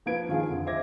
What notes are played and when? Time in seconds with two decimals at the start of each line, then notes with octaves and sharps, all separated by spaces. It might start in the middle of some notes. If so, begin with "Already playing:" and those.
0.06 F3 A#3 B4 G#6 D7
0.29 D#3 F3 F4 G#4
0.49 F2 D3
0.67 C5 D#5 E5 D6 G#6 A#6